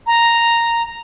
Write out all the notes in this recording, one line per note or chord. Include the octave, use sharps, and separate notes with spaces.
A#5